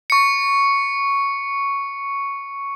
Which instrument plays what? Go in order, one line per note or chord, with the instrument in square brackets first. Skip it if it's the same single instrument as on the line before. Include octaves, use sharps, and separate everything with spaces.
[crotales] C#6 C#7